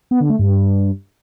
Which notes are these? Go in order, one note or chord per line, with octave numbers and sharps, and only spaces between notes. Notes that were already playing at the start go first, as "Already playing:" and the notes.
B3
D3
A3
G2